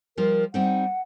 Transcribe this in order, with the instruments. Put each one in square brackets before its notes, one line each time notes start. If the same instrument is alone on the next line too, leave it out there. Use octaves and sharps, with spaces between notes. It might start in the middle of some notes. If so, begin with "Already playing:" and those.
[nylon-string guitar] F3 G3 F4 [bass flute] A#4
[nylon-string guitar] G3 C4 D#4 [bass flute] F#5